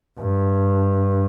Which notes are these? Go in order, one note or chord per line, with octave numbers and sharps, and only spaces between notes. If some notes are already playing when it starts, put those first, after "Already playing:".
G2